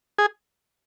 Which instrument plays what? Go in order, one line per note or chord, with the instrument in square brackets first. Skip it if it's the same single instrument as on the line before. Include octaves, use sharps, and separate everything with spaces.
[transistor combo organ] G#4